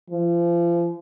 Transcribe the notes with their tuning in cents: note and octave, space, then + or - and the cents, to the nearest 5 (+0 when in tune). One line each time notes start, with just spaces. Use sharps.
F3 -35